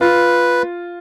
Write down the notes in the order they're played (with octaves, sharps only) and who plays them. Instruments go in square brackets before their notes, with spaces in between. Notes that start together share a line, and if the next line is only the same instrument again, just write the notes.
[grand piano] F4 [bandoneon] B4